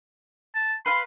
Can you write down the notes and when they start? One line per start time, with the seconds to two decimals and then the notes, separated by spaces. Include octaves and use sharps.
0.55 A5
0.86 B4 F5 B5 C6